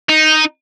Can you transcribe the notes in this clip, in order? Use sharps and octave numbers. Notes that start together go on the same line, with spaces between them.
D#4